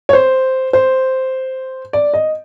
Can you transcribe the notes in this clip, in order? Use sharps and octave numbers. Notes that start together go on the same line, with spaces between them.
C#5
C5
C5
D5
D#5